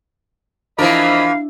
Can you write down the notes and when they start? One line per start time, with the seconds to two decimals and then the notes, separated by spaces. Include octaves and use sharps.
0.78 E3 F3 D4 E4 A#4 D#5 F5 B5